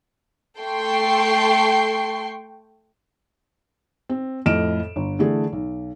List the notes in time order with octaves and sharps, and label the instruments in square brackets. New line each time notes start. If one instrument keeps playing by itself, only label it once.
[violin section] A3 A4 G5 C6 C#6 C7
[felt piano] C4
F2 A2 D#5 F6 D7 E7
G1
D3 E3 A3 G#4
B1